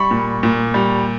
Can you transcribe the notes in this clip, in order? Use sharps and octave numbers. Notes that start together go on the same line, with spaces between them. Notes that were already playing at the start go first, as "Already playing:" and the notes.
Already playing: G3 B5 C#6
A#2
A#2
G3